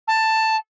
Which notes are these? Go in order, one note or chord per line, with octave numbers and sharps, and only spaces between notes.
A5